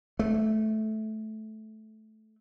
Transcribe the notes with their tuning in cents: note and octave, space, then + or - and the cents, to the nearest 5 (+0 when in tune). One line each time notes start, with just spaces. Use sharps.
A3 -15